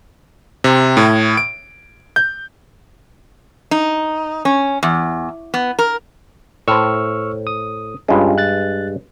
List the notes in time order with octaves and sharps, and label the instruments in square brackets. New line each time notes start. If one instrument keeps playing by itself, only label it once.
[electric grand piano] C3
A2
D7
G6
[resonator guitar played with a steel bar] D#4
C#4
E2
B3
A#4
[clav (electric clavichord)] A2 C5 [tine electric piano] C#6 E6 F6
[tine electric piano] D#6
[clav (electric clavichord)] G2 G#3 [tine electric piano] C#4 F4
[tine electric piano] F#6 A6